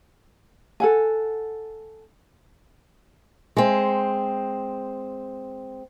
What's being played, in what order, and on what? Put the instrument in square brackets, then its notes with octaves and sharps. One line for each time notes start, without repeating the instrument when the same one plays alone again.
[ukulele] A4 F#5 G#5
[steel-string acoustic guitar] G#3 C4